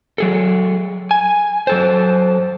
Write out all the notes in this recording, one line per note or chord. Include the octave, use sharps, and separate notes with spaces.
F#3 G#4 A4
G#5
F#3 A4 C5